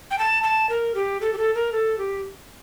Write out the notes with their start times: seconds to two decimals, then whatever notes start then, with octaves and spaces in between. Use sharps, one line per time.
0.11 G5
0.19 A5
0.43 A5
0.69 A#4
0.95 G4
1.21 A4
1.33 G4
1.38 A4
1.55 A#4
1.72 A4
1.98 G4